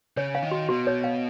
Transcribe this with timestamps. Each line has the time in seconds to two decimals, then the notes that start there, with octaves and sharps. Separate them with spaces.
0.17 C#3 C#5
0.35 F5
0.42 D#3
0.51 F#4
0.69 B2 F#4
0.87 C#5
1.04 F5